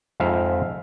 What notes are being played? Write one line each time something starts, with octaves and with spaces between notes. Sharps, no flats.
F2 G#2 E5 F5